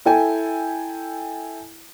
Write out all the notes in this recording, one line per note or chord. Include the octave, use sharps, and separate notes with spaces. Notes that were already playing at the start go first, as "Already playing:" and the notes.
E4 A4 G5 G#5